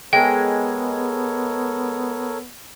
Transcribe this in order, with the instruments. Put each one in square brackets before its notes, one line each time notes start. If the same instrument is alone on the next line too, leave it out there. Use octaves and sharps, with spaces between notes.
[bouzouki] G#3 [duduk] B3 [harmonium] A4 A#4 C#5 [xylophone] G5